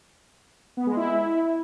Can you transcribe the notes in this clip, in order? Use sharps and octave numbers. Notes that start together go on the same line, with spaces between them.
B3
G#3
E4